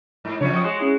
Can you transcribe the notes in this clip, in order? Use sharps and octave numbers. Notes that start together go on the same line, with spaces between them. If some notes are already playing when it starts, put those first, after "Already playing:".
G#2
F2 C#3 F3 D4 C#5
G5 C#6 D#6
G#3 F#4 C6
C#4 E4 G#4